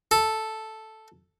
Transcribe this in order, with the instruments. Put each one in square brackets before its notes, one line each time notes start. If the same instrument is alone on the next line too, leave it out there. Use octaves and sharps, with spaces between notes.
[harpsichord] A4